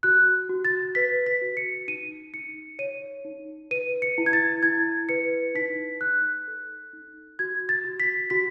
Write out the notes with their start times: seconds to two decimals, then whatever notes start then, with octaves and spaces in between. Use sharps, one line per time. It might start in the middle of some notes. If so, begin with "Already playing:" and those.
0.03 F#4 F#6
0.49 F#4
0.65 A6
0.95 B4 B6
1.26 B6
1.41 F#4
1.57 C#7
1.88 D#4 D#7
2.34 D#4 C#7
2.79 C#5 D#7
3.25 D#4
3.71 B4 D#7
4.02 C#7
4.18 E4
4.26 G#6
4.33 A6
4.63 E4 G#6
5.09 B4 C#7
5.55 D#4 B6
6.01 D#4 F#6
6.48 A4
6.93 D#4
7.39 F#4 G#6
7.69 A6
7.84 F#4
8.00 B6
8.30 F#4 B6